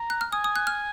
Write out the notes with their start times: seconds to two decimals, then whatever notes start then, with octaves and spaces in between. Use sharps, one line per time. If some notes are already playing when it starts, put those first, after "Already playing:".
Already playing: A#5
0.10 F#6
0.21 F6
0.32 G#5 D#6
0.44 D#6
0.56 F#6
0.67 F6